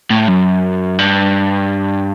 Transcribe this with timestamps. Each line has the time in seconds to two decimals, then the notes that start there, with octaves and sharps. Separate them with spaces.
0.10 A2
0.28 F#2
0.98 G2